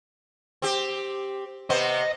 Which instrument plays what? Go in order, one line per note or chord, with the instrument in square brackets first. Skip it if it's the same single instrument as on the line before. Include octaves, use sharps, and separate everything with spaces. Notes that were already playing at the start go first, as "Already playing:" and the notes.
[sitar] C4 G4
[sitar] C3 B3 C5 [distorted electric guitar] D#5